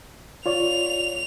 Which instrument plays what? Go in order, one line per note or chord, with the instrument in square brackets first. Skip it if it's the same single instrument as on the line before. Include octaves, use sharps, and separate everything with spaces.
[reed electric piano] F4 C#5 D5 [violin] F7